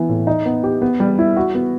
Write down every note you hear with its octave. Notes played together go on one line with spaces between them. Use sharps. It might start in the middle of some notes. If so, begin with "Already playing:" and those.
Already playing: E3 B3
A2
D#4
B3
G4
B3
G3
E4
F#4
B3